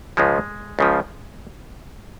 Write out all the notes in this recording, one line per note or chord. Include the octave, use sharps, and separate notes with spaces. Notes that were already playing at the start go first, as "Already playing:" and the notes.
C#2 C#3 F3 G#3
C#2 C#3 F3